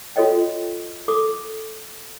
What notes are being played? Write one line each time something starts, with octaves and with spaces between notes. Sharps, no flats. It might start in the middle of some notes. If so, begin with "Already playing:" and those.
F4 F#4 A4 C#5 D#5 G5
A4 D6 D#6